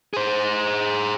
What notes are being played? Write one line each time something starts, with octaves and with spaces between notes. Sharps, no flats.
G#4 C5